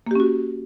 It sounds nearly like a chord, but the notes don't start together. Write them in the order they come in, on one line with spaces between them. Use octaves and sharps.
A#3 G4 C#4 F#4